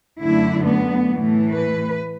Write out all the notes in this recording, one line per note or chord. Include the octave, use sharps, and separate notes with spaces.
F#2 D3 A3 E4
B3
A2 E3 A3
B4